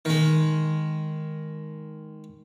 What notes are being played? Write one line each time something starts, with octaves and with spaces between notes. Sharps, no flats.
D#3 G#3